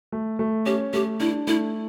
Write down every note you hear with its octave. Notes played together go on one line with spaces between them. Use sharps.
A3
A3
C#4 G4
A3 G4
D4 E4
A3 E4